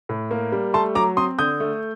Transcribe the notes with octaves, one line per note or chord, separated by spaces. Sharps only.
A2
A#3
G3
A3 A5 C6
F#3 A#5 D6
C4 C6 D#6
D3 D#6 G6
A3